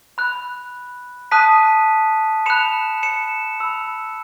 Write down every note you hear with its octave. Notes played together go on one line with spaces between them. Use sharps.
B5 F#6
A5 D#6 F#6 B6 D#7
B5 F#6 C#7 E7
C#7 E7
B5 E6